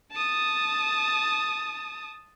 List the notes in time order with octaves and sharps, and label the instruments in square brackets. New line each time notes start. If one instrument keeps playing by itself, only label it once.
[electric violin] A5 D#6